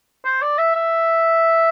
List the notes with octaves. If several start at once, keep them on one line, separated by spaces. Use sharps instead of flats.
C5
D5
E5
E5